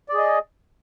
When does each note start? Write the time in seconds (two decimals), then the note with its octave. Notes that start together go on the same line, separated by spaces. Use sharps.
0.09 D5
0.14 G#4
0.18 D#5